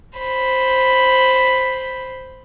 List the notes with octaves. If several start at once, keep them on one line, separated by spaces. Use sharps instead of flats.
C5 B5